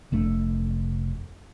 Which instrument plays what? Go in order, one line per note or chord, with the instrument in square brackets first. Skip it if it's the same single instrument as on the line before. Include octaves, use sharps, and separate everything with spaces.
[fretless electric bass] F1 A3 D4